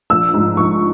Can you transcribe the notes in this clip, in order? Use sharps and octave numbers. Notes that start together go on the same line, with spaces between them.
A#1 E6
G#2 F3
A#1 C#6